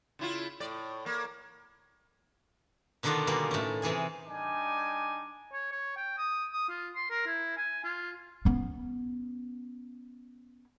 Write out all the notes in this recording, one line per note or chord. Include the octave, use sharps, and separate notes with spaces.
C#3 E4 F4
A2 D5
A#3
B2 D3 D#3 B3 D4 F4
B2 G3 A#3 G#4
A2 C#4
C3 E3 G#4 G#5
G3 D4 D#4 G#5 D6
C#5
C#5
G5
D#6
D#6
F4
C6
A#4
E4
G#5
F4
B3 C#4